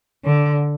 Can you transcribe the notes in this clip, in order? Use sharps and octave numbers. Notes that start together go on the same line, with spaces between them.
D3